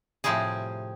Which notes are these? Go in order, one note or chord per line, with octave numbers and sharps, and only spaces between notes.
A2 C3 F3 G3 C4 G#4